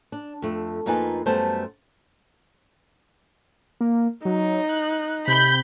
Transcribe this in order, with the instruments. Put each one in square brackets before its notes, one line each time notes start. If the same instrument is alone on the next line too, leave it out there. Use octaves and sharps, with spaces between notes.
[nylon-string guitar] D4
F2 A3
F2 A#3 D#4 F4 B4 G#5
F#2 G3 A3 B3 C5 A5
[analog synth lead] A#3
[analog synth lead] F#3 [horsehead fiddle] D#4
[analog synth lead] F#6
[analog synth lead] C3 [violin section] B5 G6